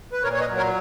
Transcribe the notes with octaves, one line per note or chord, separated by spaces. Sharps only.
B4
A#2 A#4 C#5
C#5
B4 D#5
F#3
A#4 C#5